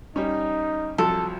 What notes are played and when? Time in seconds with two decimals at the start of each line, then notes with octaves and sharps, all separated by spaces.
0.16 G3 C#4 D#4
0.98 C2 F3 F#3 A4